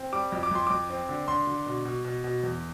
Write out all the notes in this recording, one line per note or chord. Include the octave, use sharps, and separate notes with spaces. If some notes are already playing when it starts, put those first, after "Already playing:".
Already playing: C4
G3 D6
F2
D6
F2 C6
F2 D6
C4
D3
D3 C6
D3
B2
B2
B2
B2
E2